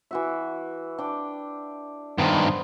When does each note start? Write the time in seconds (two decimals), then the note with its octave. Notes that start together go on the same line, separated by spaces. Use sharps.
0.11 E3 F#4 E5
0.98 D4 G5 D6
2.18 G2 D#3 B3 C5